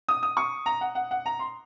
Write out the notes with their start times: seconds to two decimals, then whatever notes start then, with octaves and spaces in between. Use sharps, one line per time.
0.09 D#6
0.23 D#6
0.37 C#6
0.66 A#5
0.81 F#5
0.95 F#5
1.11 F#5
1.26 A#5
1.39 C6